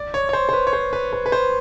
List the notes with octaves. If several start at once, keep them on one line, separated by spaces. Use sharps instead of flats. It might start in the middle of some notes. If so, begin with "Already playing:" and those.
Already playing: D5
C#5
C#5
C5
C5
B4
C#5
C5
B4
B4
B4
C5